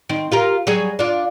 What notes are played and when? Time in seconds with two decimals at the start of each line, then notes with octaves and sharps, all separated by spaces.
0.09 D#3 C4
0.32 F4 G4 A#4
0.67 F#3 G3 G#4
0.99 D4 F4